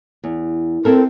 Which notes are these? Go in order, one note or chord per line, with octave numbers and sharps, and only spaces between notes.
E2
C4 E4 A4 A#4